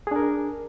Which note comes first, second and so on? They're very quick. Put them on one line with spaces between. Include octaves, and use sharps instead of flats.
G#4 D4 A#4